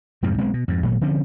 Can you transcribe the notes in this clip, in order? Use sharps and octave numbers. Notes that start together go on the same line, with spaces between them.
F2 G#2 C3 G3
B1 G#3 B3 C4
B2
F2 G#2
G#1 A#2 F#3 A3
D3 F3 C4 C#4